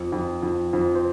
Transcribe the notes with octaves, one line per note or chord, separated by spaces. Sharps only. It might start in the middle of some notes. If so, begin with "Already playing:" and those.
Already playing: F2
F2
F2
F2
C5